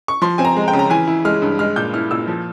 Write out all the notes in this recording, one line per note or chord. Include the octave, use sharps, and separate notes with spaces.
C#6
F3 C6
C4 G#5
A#5
G#3
G5
C#3
A#5
E3 G#5
E4
G#3 F6
G2
G#3 F6
A#2 G6
E4 F6
A#2 E6
F3